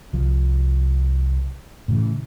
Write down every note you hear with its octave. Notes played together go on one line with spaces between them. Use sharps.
C2 F3
A2 C#3 E3